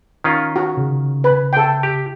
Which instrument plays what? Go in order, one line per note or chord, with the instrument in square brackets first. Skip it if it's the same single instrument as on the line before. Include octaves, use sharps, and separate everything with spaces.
[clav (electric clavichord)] D#3 C#4 F4
[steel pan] F#4
[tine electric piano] C#3
[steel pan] B4
A4 G5
[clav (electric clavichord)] G4